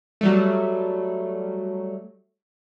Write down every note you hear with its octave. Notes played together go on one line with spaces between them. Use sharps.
F#3 G3 A3